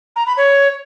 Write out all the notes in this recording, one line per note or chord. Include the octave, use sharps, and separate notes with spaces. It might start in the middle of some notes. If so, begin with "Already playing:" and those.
A#5
B5
C#5